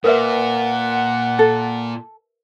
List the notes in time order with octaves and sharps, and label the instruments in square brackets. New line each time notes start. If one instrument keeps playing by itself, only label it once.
[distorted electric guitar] A#2 [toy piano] A#4 B4 E5 [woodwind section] F#5
[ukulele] A4